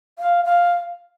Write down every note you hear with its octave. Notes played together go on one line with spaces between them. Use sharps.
F5
F5